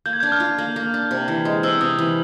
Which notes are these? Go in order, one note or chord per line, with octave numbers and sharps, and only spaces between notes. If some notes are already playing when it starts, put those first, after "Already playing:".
A#3 G6
G#6
D4 G6
F6
F4
A#3
A#3
D4
C3
E3
G#3
C3 E6
C3 D#6
E3